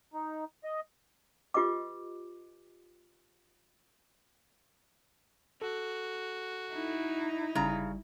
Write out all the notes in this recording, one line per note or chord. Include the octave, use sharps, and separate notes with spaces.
D#4
D#5
F4 G4 B4 D#5 D6
F#4 A4
D#4 E4
G1 C#3 G3 A#5